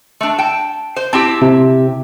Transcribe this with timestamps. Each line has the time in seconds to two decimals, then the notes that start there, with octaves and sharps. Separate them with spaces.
0.21 A3 D4
0.38 G5 A5
0.96 C5
1.13 C4 E4 G4 A5
1.42 C3